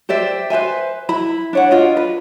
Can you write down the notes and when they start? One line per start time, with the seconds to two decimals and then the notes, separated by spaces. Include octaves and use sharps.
0.09 G4 C5 D5 E5
0.50 B4 C5 E5 G#5
1.09 E4 B5
1.53 D4 C#5 F#5
1.71 D4 F4 D#5
1.97 B4